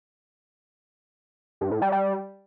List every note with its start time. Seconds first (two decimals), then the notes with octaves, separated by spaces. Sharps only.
1.61 G2
1.71 A2
1.82 G3
1.92 G3